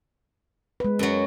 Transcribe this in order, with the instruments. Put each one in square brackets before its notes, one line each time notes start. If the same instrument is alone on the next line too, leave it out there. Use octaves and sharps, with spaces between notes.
[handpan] G#3 B4
[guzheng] F#2 F#3